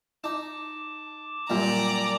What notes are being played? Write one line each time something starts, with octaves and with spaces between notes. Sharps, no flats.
D#4 A5 D6
F#2 A#2 G3 D5 A#5